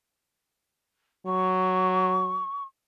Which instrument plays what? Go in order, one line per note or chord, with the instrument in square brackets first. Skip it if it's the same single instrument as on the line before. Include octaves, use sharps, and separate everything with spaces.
[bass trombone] F#3 [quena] C#6